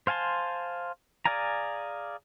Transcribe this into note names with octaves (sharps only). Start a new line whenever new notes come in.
C5 F5 G#5 A5 C6
G#4 D5 F5 G#5 A#5